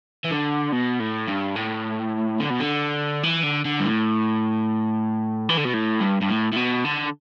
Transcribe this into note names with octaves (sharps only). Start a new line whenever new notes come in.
E3
D3
B2
A2
G2
A2
D3
B2
D3
E3
D3
D3
G2
A2
E3
D3
B2
A2
G2
G2
A2
A2
B2
D3